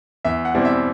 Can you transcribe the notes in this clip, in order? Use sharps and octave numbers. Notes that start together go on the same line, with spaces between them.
E2 E5
F#5
B2 G3 C4 E4
E5